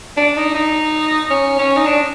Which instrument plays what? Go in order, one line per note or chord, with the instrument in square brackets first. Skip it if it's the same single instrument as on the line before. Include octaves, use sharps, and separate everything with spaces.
[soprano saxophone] D4
D#4
D#4
C#4
C#4
D#4
D4